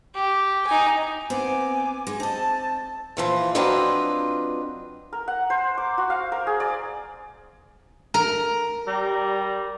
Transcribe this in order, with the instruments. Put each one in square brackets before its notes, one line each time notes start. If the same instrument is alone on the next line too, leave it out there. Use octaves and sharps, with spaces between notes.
[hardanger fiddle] G4
D#4 G#5
[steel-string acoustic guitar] B3 C4 [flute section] G#5 D6
[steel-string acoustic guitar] G#3 D#4
[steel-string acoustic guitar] C4 D#5 [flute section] A5
[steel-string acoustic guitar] A#2 E3 F3
F#3 C4 D4 F4 B4 D#5
[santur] A#4
F#5
C5
D6
F#4
F5
A#4
G#4
D5
[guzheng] A#4
[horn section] G3 A#5